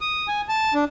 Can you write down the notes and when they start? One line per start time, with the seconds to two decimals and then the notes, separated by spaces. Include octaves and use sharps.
0.01 D#6
0.28 G#5
0.49 A5
0.74 D4